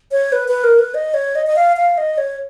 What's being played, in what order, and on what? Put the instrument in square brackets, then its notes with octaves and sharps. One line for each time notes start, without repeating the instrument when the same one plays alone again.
[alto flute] C#5
B4
B4
A#4
B4
D#5
C#5
D#5
D#5
F5
F5
D#5
C#5